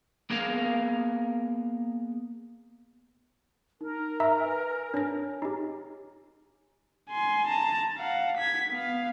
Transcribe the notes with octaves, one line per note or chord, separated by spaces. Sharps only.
A#3 B3 G#4 A#4 F5
D#4 A#4
E5 A#5 E6
B4 G#5
D4 C#5 G#5 A#6
D#4 G4
G#5 C6
A5 A#5
F5 F#5
G#6 B6
B3 F5